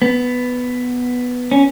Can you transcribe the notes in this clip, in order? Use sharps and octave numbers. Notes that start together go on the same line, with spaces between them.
B3
C#4